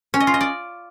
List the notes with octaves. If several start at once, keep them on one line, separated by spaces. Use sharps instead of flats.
C#4
D#5
F4
D#5
D5